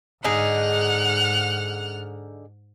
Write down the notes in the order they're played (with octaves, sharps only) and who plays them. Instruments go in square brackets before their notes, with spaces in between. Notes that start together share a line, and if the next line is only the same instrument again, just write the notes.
[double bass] G#2 [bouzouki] D3 D#4 G#4 [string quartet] F#5 F6